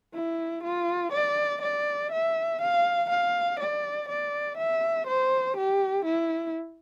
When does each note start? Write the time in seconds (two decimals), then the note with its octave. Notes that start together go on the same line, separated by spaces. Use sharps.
0.14 E4
0.64 F4
1.13 D5
1.62 D5
2.12 E5
2.62 F5
3.10 F5
3.60 D5
4.09 D5
4.58 E5
5.07 C5
5.57 G4
6.06 E4